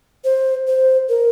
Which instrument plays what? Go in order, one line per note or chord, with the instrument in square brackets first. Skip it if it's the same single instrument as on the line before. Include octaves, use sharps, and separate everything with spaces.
[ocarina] C5
C5
A#4